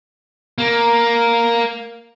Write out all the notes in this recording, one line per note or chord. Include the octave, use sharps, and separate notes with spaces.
A#3